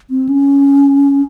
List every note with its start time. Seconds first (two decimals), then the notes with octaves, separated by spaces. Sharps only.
0.10 C4
0.29 C#4